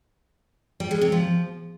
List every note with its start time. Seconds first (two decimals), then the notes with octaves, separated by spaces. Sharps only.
0.80 G3
0.91 G#3
1.01 C3
1.12 F3